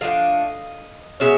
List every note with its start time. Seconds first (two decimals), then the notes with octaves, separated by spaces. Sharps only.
0.01 F3 A3 D4 D#5 F5
1.20 B2 G#3 C#4 E5